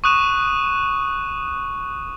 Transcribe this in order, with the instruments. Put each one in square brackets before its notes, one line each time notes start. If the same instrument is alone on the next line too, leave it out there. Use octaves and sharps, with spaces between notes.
[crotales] C#6 D#6 F#6 D#7 E7